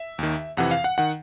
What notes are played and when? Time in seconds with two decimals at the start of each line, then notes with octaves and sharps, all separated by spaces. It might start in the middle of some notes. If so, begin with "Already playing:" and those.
Already playing: E5
0.19 D#2 D#3
0.57 F2 C3 E3 F#5
0.71 F5
0.84 F#5
0.98 D#3 F#5